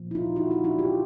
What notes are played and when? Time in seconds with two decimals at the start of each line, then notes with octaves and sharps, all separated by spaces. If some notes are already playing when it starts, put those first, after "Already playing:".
Already playing: A#2 F3 A#3
0.11 E4
0.15 D#4 F4
0.36 E4 F#4
0.51 E4 F#4
0.64 D4 E4
0.79 F4 G4